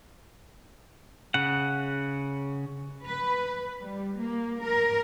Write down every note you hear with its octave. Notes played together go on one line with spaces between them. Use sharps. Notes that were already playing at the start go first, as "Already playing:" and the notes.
C#3 F#5
B4
G3
A#3
A#4